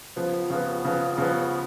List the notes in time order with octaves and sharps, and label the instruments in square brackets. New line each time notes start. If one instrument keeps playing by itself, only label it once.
[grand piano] C#3 F3 B3
C#3 F3 B3
C#3 F3 B3
C#3 F3 B3